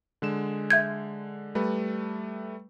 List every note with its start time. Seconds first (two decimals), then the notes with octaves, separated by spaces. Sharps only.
0.22 D3 G#3 E7
0.70 E5 G6 G#6
1.55 G3 A3 B4